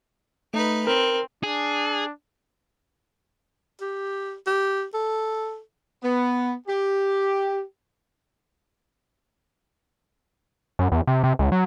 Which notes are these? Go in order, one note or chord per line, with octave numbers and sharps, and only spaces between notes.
A3 D#4 B4
C4 A#4
D4 G#4
G4
G4
A4
B3
G4
F#2
E2
C3
C3
C#2
F#3